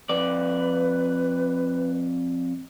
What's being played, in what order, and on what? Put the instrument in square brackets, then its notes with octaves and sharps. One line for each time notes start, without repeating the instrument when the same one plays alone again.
[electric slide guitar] F2 D5 [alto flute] B4